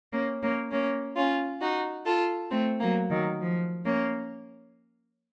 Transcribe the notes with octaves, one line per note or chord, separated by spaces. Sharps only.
A#3 C#4
A#3 C#4
A#3 C#4
C#4 F4
D#4 F#4
F4 A4
A3 C4
F#3 A#3
D#3 F#3
F3
A#3 C#4